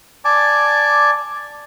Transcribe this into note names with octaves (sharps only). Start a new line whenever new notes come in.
D5 G#5 A5 D6